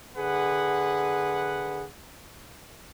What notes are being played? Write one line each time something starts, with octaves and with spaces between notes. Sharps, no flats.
D3 G#4 B4 F#5